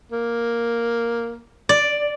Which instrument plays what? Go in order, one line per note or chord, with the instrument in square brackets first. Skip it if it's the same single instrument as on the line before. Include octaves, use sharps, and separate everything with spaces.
[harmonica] A#3
[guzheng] D5